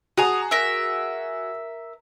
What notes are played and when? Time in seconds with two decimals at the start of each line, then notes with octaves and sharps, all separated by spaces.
0.18 F#4 G#4 A#5 D#6
0.51 A#4 E5